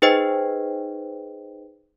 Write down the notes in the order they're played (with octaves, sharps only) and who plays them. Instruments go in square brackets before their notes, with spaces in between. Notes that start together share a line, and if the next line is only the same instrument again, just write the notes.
[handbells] D#4 G#4 B4 C5 D#5 G5